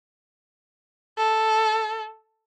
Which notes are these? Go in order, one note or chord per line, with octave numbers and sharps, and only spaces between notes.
A4